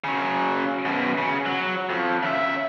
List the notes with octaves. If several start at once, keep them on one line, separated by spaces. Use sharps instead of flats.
C#3 F#3
F#2 B2
C#3
F#3
F2
C#3 E5